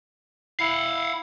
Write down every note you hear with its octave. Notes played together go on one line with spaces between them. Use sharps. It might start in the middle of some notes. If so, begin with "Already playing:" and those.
E4 F5 F#5